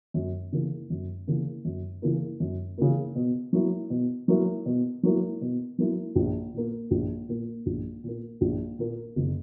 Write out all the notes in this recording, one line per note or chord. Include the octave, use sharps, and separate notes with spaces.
F#2
C#3 E3 A#3
F#2
C#3 E3 A#3
F#2
C#3 E3 A#3
F#2
C#3 E3 A#3
B2
F#3 A#3 E4
B2
F#3 A#3 E4
B2
F#3 A#3 E4
B2
F#3 A#3 E4
A#1
A#2 A#3
A#1
A#2 A#3
A#1
A#2 A#3
A#1
A#2 A#3
F#1